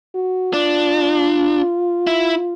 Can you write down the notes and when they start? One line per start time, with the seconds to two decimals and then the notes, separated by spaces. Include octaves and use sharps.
0.15 F#4
0.53 D4 F4
2.07 E4